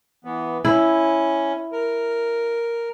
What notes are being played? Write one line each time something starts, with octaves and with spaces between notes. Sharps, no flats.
E3 B3
C#4 E4
A#4